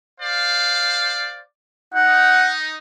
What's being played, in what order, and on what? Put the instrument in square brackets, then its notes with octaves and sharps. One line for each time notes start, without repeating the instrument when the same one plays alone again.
[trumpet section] C5 D5 F5
[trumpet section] D#4 [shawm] F#5